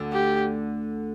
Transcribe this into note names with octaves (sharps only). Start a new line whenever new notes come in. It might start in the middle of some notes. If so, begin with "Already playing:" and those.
Already playing: D2 D3
G4